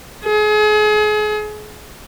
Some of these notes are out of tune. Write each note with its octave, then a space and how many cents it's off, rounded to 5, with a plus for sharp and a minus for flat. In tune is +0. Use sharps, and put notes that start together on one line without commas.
G#4 +35